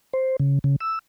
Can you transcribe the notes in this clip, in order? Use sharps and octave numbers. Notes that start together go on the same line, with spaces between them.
C5
C#3
C#3
E6